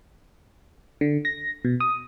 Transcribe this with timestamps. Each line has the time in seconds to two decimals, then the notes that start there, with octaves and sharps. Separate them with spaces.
1.01 D3
1.25 A#6
1.65 B2
1.80 D#6